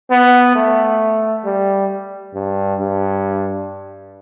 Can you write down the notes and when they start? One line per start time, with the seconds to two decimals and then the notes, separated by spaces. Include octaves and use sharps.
0.10 B3
0.56 A3
1.45 G3
2.34 G2
2.80 G2